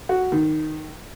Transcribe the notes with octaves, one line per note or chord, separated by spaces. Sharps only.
F#4
D#3